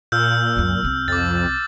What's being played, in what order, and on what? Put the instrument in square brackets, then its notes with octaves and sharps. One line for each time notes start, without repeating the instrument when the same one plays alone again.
[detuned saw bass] A#2 [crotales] E6 F6 G6
[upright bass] C#2 F#2
C2 C4
[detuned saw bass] F2 [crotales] D6 A6